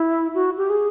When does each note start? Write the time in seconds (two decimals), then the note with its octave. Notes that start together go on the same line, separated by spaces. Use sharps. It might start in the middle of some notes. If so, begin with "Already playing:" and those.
Already playing: E4
0.35 F#4
0.58 G4
0.70 G#4